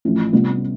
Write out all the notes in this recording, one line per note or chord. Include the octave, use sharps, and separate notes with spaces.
A1 A2 F3
C3 G3 B3 F4